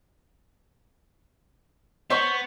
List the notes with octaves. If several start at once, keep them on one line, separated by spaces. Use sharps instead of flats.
B3 C5 C#5 C#6